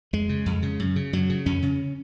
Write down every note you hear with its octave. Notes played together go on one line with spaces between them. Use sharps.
F2 G#3
C#3
F2
C#3
F#2
C#3
F#2 F#3
C#3
F2 C#4
C#3